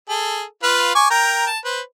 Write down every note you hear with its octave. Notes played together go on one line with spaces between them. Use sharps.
G#4 A4
F4 B4 F5
G#5 C#6 D6
A#4 G5 A#5
A5
B4 C5